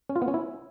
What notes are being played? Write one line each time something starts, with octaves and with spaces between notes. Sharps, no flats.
C#4
F4
B3
C#4
E4